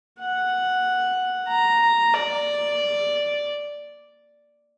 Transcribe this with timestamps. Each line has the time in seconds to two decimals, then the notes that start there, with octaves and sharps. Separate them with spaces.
0.20 F#5
1.49 A#5
2.13 D5